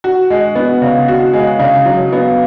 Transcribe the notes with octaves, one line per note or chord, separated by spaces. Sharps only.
F#4
G#3
B3
C#3
F#4
G#3
C#3
F#3
B3